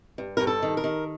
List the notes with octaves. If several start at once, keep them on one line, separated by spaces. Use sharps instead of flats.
G2
G2 A#4
A4
D#3
A#4
D#3